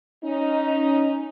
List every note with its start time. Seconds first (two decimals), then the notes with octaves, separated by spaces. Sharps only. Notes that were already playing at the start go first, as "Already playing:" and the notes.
0.24 C#4 D#4